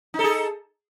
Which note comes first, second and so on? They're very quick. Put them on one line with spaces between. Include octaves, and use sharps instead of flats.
D#4 A4 G#4